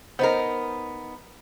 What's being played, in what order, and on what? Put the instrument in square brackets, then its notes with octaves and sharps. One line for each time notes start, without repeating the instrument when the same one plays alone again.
[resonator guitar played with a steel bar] B3 D#4 A#4 [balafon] C5 D#5